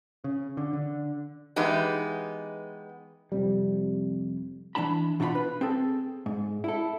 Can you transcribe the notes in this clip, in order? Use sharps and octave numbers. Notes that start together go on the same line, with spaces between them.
C#3
D3
D3
E3 G#3 B3 D#4 G4
F2 C3 G3
E3 B3 D4 A5 B5
B2 D4 E4 F4 B5
B4
C4 G#4 A4
G#2
E4 A4